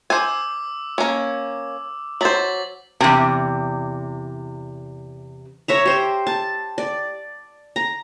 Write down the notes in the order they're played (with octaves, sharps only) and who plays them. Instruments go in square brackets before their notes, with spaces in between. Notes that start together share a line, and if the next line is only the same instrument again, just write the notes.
[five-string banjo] C5 G#5 [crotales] D6 E6
[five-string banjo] A#3 C#4
[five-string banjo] F#3 C5 [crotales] A6 B6 F#7
[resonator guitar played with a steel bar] E2 C3
[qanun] C#5 E5 A#5
G4 C5
A5
D5
A#5